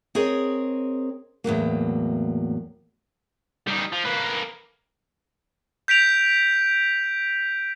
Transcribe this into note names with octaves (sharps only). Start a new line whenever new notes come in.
C4 G#4 A#4 C#5 D#5
E2 A2 F#3 A#3
G3 D#4
F3
A#3 B4
G6 B6 D7 F7